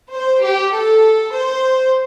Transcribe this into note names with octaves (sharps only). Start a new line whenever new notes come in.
C5
G4
A4
C5